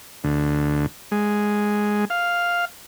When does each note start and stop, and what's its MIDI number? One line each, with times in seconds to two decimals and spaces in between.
0.24 0.86 38
1.11 2.05 56
2.10 2.65 77